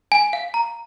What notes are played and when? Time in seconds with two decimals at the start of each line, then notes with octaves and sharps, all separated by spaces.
0.12 G#5
0.33 F5
0.54 A#5